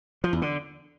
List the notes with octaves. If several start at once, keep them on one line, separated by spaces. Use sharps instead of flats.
F3
E2
D3